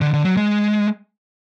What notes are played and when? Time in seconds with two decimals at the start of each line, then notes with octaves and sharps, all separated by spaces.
0.01 D3
0.14 D3
0.25 F#3
0.37 G#3